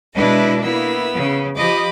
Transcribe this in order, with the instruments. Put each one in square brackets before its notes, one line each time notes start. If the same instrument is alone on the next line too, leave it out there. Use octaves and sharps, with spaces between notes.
[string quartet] B2 B4 D#5 [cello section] G#3 D4 E4
[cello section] A#3 E4 [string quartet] B3 E6
[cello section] C#3
[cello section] F3 D#5 [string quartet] G4 B5 D6